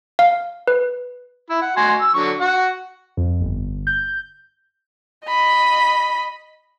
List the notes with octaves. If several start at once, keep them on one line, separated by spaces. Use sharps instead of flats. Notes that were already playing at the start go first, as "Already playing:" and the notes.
F5
B4
E4
F#5
F#4 G#5 C6
E6
D3 F#3 C#6
F#4 F#5
F2
G1
G6
D#5 B5